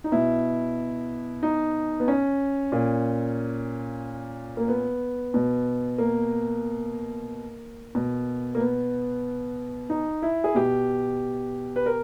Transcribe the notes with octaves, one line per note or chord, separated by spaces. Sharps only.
D#4
B2 E4
D#4
B3
C#4
A#2
A#3
B3
B2
A#3
B2
A#3
B3
D#4
E4
G#4
B2 G4
B4
A#4